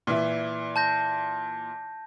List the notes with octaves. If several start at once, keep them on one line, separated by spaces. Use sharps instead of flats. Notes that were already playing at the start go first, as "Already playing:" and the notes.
A#2 E3 E5
A5 G6 A#6